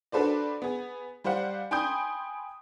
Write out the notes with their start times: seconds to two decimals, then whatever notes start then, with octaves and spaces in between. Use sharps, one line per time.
0.12 D4 F#4 A4 B4 C5 D5
0.62 B3 G#4
1.24 G3 G4 C5 F5 F#5
1.71 G5 G#5 B5 C6 D#6 G6